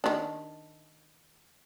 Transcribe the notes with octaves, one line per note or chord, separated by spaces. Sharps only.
D#3 C#4 D4